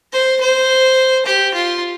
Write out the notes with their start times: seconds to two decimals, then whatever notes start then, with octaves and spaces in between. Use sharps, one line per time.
0.12 C5
0.40 C5
1.26 G4
1.54 F4